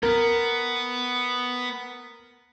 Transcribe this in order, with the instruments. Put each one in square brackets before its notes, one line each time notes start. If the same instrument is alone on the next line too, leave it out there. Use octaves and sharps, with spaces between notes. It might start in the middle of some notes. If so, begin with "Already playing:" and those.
[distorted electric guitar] B3 [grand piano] A#4